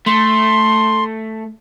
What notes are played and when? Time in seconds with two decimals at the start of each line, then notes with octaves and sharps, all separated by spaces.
0.06 A3 C6